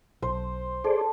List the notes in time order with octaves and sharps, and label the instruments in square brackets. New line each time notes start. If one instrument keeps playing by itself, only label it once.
[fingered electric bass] B1 [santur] C5
[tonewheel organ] G#4 C5 D5 [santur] A4